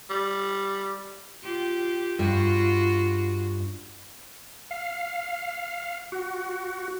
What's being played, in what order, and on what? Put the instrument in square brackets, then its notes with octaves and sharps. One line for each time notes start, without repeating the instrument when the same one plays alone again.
[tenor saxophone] G3
[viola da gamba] F4 G4
[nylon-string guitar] G2 [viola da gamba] F4 F#4
[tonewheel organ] F5
F#4